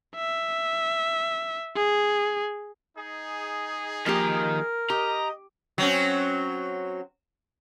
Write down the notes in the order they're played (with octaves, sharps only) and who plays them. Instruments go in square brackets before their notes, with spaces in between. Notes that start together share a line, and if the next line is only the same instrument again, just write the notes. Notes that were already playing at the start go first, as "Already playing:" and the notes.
[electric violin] E5
G#4
[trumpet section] D#4 G#4
[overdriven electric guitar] D#3 A#5 [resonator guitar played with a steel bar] F3 A#3 G4 [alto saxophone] A#4
[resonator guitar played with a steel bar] G4 [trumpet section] D#5 [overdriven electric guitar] A#5
[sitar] F#3 C4 C#4